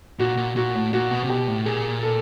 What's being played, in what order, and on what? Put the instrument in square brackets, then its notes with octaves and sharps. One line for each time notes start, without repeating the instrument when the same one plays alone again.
[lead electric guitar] A#2 [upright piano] F#4
[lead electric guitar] A#2
[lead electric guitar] A#2 [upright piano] F#4
[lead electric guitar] A2
[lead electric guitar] A#2 [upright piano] F#4
[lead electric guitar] B2
C3
[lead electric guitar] B2 [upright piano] G4
[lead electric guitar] A2
[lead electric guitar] A#2 [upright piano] G#4
[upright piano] A4